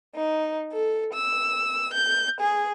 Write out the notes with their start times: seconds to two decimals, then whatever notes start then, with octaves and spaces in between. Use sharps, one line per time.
0.15 D#4
0.72 A4
1.14 E6
1.94 G6
2.41 G#4